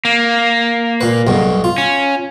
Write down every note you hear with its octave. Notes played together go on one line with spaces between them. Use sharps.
A#3
A#2 B4
B1 G2 B2
F4
C#4